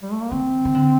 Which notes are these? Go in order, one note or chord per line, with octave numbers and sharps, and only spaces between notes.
G3
A3
A#3
D#3 C4
D#3
D3